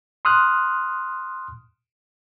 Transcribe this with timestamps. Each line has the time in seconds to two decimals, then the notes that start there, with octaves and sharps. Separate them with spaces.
0.25 C6 D#6 F6 F#6